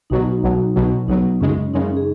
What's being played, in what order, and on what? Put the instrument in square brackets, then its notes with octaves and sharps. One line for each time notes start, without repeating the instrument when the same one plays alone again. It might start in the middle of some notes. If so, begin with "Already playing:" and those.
[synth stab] B1 B2 F#3 [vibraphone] D#4
[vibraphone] D#4
F#4
[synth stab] B1 B2 F#3
B1 B2 F#3
[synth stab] B1 B2 F#3 [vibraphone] D#4
[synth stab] F#2 C#3 G#3 [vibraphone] C#4
[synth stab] F#2 C#3 G#3 [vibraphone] D#4
[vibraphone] G#4